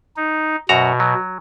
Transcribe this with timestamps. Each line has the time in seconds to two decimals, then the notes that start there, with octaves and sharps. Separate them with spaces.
0.17 D#4
0.69 F#2 B2 F#4 A#5
1.00 F#3